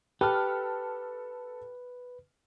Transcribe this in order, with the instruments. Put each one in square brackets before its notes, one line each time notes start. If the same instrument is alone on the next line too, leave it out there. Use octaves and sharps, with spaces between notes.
[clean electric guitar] G4 [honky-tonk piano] A4 F6 [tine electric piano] B4